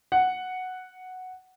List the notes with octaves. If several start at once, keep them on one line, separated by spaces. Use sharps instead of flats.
F#5